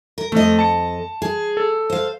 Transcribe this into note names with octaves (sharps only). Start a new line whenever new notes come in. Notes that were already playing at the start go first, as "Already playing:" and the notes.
A#4
F2 A3 D#5
A5 C#7
G#4
A4
C5 F5